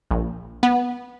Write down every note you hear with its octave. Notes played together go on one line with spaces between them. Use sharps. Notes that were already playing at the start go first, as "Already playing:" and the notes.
A#1
B3